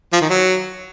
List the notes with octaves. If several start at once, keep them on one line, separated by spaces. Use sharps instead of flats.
F3
D#3
F#3